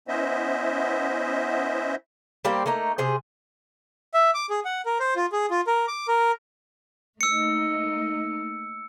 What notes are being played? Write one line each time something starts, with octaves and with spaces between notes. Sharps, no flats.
B3 C#4 E4 C5 D#5 E5
G3 A#3 C4 G4
A3 A#3 D#4 A#5
C3 G#4 C5
E5
D6
G#4
F#5
A#4
C5
F4
G#4
F4
A#4
D6
A#4
A3 A#3 D#4 E6 C#7